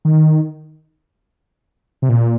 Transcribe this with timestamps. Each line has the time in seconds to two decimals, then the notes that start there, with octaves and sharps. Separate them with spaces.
0.05 D#3
2.02 C3
2.09 A#2